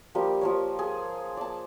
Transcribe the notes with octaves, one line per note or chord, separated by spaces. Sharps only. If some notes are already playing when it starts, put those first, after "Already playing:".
F3 G3 A#3 G4
F3 A#3 C#5
G#4
D5 A5